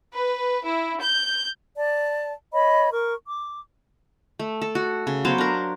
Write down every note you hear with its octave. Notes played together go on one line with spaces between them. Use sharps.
B4
E4
G6
D5 A5
C#5 D#5 B5
A#4 C#6
D6
A3
A4
F#4
C#3
F#3 B3 C5 F5
D4 A#4